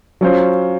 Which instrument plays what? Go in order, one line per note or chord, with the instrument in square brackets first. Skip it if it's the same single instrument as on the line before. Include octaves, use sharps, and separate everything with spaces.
[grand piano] F#3 C#4 F4 C5